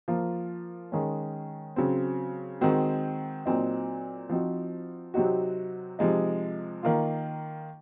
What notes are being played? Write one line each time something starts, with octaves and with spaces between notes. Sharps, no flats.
F3 A#3 F4
D#3 G#3 C#4
C#3 F#3 C4
D#3 G#3 C4 F#4
A#2 F#3 C4 D#4
F3 C4 D#4 F#4
C3 F#3 C4 D#4 F#4
C3 F3 G#3 D#4
D#3 A#3 F4